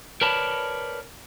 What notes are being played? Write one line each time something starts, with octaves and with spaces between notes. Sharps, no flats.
A#4 B4 C#5 D5 A5 B5